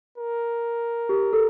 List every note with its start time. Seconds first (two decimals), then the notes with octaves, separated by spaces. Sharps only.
0.18 A#4
1.09 G4
1.33 A4